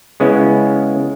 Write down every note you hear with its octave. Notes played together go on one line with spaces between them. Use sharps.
C#3 G#3 B3 C#4 E4